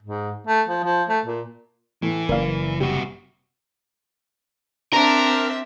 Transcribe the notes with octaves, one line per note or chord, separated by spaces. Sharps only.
G#2
A3
F3
F3
A3
A#2
A2 E3
F#1 A#3 D5 F5
C3 G3 F#4
C4 D4 A#4 E5